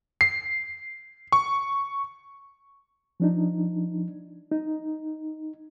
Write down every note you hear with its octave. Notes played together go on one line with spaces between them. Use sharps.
C7
C#6
F3 D4 D#4
D#4